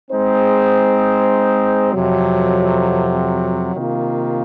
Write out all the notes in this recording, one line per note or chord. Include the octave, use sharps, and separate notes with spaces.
G#3 C4 D#4 G#4 C5
F2 C3 F#3
C3 D#3 A#3 F4